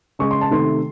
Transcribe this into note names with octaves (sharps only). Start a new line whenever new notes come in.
C#3 G#3 C#6
C6
A5
C3 D#3 A3 C6